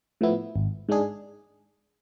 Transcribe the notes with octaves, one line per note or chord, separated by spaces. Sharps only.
A2 F3 B3 E4
G#1
G#2 G#3 D4 G#4